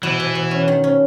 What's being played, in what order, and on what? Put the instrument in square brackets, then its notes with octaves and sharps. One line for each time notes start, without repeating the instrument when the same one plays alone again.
[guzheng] B2 [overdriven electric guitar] E3
[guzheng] B2
B2
C#4
D#3
C#4